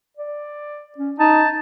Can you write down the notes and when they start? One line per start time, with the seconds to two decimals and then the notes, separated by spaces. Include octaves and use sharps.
0.17 D5
0.98 C#4
1.19 D#4 A5